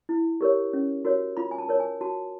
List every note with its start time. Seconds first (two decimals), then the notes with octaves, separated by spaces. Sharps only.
0.09 E4
0.41 G4 A#4 C#5
0.73 C#4
1.05 F#4 A#4 C#5
1.37 F4 B5
1.51 G#5
1.58 A5
1.69 A#4 C#5
1.80 G#5
2.01 F#4 A5